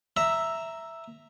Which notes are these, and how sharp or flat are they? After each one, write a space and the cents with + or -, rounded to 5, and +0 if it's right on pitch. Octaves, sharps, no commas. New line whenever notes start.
E5 +0 A#5 +0